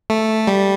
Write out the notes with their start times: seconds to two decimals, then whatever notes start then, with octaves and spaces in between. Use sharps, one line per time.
0.10 A3
0.47 G3